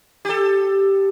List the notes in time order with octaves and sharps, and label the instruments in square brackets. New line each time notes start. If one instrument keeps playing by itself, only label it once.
[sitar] G4 A4